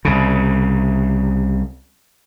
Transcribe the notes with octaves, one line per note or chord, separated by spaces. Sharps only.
C2 C#3